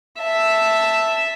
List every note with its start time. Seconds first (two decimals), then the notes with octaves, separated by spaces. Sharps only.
0.21 E5 A5